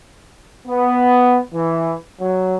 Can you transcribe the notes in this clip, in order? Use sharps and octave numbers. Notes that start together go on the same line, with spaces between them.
B3
E3
F#3